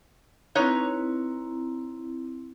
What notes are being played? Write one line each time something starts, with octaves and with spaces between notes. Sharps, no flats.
C4 D#4 E4 B4 C#5